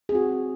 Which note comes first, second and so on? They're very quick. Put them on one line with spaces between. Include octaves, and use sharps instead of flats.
G#4 C4 F#4